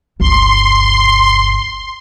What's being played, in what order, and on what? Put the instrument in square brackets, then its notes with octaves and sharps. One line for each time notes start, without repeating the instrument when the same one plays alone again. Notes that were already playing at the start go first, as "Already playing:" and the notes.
[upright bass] G1 C#2 [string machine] C6